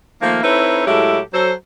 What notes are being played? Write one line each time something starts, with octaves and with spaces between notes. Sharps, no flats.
D#3 F3 A3 A#3
C4 D#4 E4 A4 B4 C#5
A2 F#3 G#3 E4 G4 A4
F#3 A4 C5